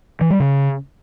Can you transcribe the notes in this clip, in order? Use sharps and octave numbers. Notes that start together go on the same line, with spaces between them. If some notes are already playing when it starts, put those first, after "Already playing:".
E3
G3
C#3